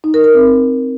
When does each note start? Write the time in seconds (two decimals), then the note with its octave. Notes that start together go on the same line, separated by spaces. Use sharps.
0.04 D#4
0.14 A#4
0.24 A#4
0.34 C4